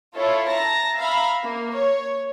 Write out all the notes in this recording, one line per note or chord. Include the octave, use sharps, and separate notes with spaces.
E4 F4 A4 C#5
A5 A#5 A#6
E5 F5 A#5 B5
A#3
C#5